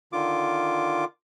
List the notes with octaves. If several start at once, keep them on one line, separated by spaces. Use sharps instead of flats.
D3 D#3 F4 D6